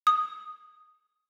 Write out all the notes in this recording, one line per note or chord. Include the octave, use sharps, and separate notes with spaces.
D#6